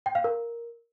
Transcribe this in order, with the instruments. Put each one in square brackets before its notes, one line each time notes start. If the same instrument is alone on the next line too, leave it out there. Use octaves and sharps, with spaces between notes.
[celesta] G5
F5
A#4